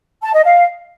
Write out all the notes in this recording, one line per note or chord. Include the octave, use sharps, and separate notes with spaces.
A5
D#5
F5